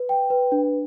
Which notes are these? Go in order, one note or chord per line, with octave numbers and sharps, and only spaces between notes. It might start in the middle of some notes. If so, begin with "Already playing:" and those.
Already playing: B4
G5
B4
D4